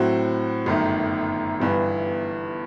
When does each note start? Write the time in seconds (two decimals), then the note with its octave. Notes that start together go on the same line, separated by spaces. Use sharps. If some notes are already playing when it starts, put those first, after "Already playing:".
Already playing: A2 F#3 C4 F#4
0.66 G1 F#2 D#3 A3
1.60 G1 G2 E3 B3